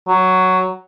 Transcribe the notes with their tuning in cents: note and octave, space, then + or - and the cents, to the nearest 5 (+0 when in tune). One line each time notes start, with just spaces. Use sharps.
F#3 +5